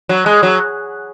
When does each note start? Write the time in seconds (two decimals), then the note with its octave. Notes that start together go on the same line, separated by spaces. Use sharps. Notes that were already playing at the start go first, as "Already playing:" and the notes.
0.09 F#3
0.26 G#3
0.43 F#3